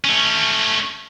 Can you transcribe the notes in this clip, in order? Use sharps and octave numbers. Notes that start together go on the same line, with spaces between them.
A3 C#4